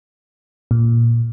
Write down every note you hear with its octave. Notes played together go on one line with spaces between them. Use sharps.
A#2